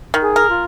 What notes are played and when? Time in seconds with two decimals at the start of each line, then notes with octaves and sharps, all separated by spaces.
0.14 D#3
0.22 G#4
0.36 A#4
0.50 F4